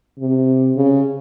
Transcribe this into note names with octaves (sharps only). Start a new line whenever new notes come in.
C3
C#3